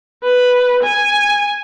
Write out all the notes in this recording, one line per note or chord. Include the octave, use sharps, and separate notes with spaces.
B4
G#5